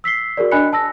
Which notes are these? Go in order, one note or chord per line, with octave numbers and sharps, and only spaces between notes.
E6 B6 C7 G7
F#4 G#4 A#4 D5
D4 D#5 G#5 B5 F#6 C#7
A5 E6 A#6